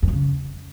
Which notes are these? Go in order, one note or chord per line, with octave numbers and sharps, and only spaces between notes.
F2
G2
C#3